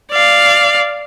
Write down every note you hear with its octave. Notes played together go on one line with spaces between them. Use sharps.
D5 F5